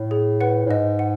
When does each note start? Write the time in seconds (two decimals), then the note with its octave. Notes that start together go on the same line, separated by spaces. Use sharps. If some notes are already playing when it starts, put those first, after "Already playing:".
Already playing: A2
0.11 G#4
0.41 B4 F#5
0.66 A2
0.70 G#2 D#5
0.99 F#5